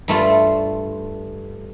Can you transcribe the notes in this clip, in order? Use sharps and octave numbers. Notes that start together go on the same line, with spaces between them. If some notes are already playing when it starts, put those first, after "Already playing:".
G2 A3 F4